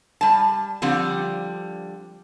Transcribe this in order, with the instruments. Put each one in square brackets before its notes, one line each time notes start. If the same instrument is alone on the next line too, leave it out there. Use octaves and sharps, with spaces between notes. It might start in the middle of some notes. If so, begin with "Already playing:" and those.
[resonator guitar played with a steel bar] G3 A5
D3 F3 G3 C4